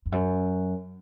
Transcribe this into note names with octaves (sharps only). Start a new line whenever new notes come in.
F2
F#2